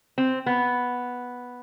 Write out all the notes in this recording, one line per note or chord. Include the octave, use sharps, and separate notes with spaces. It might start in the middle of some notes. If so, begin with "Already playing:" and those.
C4
B3